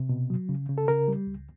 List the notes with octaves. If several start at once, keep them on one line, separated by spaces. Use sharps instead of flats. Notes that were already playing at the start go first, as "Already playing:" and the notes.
Already playing: C3
B2
F#3
C#3
C#3
A4
C#3 A#4
G3
C#2